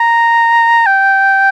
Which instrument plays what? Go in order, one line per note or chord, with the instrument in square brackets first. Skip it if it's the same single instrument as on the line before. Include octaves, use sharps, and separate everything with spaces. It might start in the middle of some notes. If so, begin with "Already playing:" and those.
Already playing: [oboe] A#5
G5